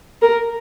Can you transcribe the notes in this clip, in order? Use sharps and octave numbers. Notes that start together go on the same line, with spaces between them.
A#4